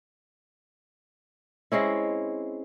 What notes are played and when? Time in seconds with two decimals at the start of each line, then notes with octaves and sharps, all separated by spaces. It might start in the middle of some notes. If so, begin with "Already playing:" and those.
1.72 G#3 C4 C#4 E4